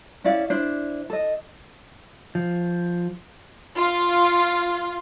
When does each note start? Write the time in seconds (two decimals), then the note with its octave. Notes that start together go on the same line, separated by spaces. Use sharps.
0.24 C#4 E4 D5 F5
0.50 D4 E4 C5 D5
1.10 A4 D#5
2.35 F3
3.77 F4